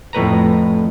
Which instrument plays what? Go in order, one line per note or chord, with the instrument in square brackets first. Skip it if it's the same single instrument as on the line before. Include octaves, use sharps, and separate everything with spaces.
[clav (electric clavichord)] F2 A2 B4 A#5